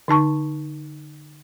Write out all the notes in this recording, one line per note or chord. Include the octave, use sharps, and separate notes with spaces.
D3 D#4 A5 C#6